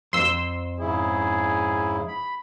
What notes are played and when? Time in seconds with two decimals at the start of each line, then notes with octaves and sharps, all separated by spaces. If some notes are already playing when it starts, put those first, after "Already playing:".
0.13 F2 C5 C6 E6
0.80 G#2 C#3 E4 G#4
2.08 B5